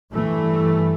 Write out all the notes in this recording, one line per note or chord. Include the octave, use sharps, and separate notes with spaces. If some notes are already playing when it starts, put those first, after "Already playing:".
G2 E3 A3